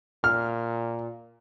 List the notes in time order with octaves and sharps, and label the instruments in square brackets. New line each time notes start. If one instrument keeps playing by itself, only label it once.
[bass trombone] A#2 [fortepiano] F6